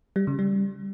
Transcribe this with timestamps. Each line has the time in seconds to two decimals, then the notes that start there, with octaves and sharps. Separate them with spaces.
0.16 G3
0.27 C#3
0.39 G3